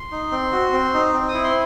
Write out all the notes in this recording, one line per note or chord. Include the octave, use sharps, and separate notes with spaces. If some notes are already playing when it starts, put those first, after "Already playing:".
Already playing: C6
D#4
C4
F#4
C4
D#4
C4
D#6
E4
C6